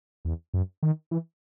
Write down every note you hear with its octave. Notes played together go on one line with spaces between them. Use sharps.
E2
F#2
D#3
E3